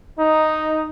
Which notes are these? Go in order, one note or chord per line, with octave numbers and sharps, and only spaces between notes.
D#4